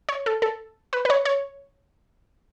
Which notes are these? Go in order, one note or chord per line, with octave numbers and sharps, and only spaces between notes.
C#5
A4
A4
B4
B4
C#5
C#5